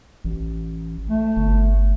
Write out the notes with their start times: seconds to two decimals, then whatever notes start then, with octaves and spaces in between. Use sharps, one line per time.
0.24 A1
1.09 A3
1.36 G1